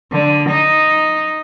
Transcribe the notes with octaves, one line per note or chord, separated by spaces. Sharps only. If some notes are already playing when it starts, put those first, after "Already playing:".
D3
D#4